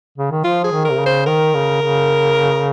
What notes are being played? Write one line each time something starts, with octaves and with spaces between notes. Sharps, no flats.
C#3
D#3
F3 F4
G#4
D#3
A#4
C3
C#3
C5
D#3 A#4
C#3
C#3